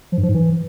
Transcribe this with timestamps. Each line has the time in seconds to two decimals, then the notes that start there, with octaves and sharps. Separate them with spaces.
0.12 F3
0.18 G2
0.23 F3
0.29 G#2
0.35 E3